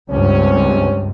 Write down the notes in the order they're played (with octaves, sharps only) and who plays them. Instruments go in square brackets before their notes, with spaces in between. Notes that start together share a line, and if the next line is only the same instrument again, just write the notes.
[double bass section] C#2 G2 [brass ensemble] C3 C4 C#4